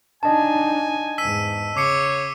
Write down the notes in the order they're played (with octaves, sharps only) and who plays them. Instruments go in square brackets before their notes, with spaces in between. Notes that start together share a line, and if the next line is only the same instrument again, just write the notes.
[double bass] D4 D#4 [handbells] D#5 A5 [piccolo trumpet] G#5
[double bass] E2 G#2 [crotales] E6 B6 D#7
[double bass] C#3 [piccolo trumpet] C#5 [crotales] D6 C7 C#7